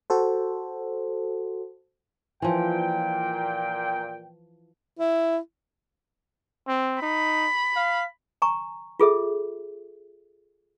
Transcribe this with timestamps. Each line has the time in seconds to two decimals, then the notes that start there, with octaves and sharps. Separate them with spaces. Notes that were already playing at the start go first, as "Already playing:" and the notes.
0.10 F#4 A4 C5
2.42 A#2 E3 F3 G5
4.99 E4
6.68 C4
7.02 D#4 B5
7.76 F5
8.42 G#5 A#5 C#6
9.00 F4 G#4 A4 E5